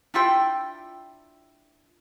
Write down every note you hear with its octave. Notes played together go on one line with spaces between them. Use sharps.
D4 E4 F4 G5